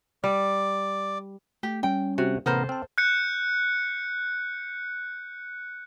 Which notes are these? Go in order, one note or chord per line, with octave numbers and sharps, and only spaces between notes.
G3 D5
A3 G4
G3 C#4 G5
C3 F#4
A1 C3 B3 A4 A#4 C5
C4 A5 F6
F#6 G6 C#7